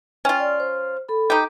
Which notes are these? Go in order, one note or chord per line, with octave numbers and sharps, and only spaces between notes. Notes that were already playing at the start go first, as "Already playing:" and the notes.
C#4 F4 G5
D5
C5
A4 B5
D#4 G4